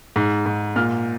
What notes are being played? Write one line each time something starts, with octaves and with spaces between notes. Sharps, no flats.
G#2
G#2
A#2 F6